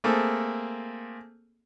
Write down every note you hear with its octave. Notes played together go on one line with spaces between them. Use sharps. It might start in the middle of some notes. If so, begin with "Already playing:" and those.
A3 A#3 C4 G#4 A4